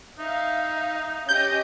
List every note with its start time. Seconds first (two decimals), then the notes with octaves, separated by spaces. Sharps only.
0.19 D#4 E5 F5
1.29 C#4 G4 D#5 G6